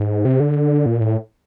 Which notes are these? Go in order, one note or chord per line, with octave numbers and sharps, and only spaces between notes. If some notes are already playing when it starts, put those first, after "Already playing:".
Already playing: G#2
C3
D3
A#2
A2